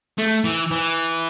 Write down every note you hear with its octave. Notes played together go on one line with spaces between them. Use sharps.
A3
E3
E3